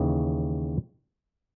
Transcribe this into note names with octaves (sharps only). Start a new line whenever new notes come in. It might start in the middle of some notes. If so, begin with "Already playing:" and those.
Already playing: D#2 C#3 E3